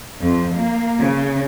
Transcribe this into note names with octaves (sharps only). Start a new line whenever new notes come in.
F2
A#3
C#3